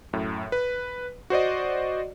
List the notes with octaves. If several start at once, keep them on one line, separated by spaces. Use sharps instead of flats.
F#2 A2
B4
F#4 C5 D5 D#5